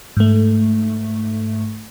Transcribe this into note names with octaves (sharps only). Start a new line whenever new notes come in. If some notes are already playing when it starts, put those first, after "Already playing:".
G#2 A3